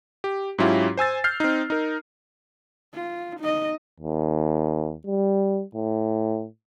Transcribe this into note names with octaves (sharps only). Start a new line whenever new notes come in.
G4
G#2 F#3 C#4 E4 F4 G4
C5 G#5 E6 A6
F6 G6 C7
C4 D#4
D#4 A#4
F4
D#4 D#5
D#2
G3
A2